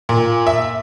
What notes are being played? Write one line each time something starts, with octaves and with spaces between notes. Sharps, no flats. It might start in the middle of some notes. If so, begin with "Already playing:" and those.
A#2
E5